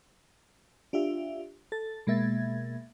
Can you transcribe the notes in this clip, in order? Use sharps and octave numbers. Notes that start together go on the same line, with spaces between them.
D4 F4 G4 E5
A4 A6
B2 G#3 A#3 E5 G#6 A6